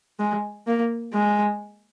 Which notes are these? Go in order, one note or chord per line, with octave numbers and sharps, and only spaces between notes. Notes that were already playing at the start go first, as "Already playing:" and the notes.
G#3
A#3
G#3